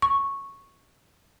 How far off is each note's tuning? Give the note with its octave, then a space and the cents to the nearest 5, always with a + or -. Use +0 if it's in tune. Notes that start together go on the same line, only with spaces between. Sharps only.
C#6 -5